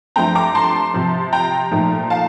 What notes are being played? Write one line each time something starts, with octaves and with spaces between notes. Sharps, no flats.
G2 F3 A3 C4 G5 A#5
A#5 D6
A5 C6
C3 F3 C4
G5 A#5
A#2 F3 A3 D#4
F5 A5